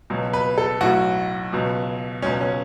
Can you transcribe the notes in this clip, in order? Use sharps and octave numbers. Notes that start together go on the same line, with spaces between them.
C#2 B2 F#3
B4
A4
B1 A2 F#3 F#4
C#2 B2 F#3
C#2 B2 F#3 C#4
C#4